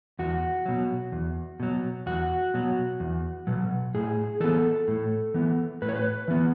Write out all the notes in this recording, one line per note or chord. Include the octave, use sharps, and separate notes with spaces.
E2 F#4
B2 F#3
E2
B2 F#3
E2 F#4
B2 F#3
E2
B2 F#3
A2 G#4
E3 B3 A4
A2
E3 B3
A2 B4
C#5
B4
E3 B3